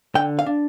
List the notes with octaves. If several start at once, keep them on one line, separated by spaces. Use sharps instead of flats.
D3 G5
F5
D4